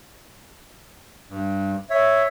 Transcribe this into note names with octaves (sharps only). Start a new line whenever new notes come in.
G2
C#5 E5